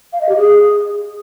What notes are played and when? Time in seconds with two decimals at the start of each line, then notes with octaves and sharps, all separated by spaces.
0.13 F5
0.21 D#5
0.29 G4
0.37 G#4